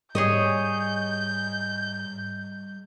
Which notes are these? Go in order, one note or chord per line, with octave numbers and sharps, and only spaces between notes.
G#2 G3 G#4 C#5 D#5 G6